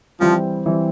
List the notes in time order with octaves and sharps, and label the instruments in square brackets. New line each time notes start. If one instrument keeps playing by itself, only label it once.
[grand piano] E3 G3 C4 [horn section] F3
[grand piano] E3 G3 C4